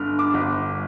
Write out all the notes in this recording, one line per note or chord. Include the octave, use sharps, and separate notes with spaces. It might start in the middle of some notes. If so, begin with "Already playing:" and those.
Already playing: G1 G2 D3 F6
D6
G1